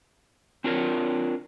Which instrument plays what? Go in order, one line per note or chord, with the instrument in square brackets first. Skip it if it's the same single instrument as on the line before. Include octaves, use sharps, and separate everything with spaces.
[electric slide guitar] C4 D4 F4 A#4 B4 C#5